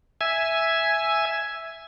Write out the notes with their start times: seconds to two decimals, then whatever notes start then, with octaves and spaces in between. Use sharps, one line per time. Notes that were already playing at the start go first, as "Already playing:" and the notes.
0.21 E5 G#5